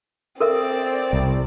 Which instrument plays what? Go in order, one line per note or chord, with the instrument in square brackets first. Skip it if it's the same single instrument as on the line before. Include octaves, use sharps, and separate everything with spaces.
[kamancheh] C4 D5 [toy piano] A4 A#4 E5
[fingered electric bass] C2